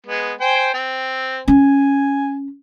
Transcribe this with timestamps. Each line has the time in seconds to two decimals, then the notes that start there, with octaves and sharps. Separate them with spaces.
0.06 G#3 B3
0.40 C5 G5 G#5
0.74 C4
1.48 C#4 G#5